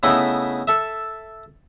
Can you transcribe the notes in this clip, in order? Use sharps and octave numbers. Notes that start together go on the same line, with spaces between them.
C#3 A3 B3 D#4 E4
A4 E5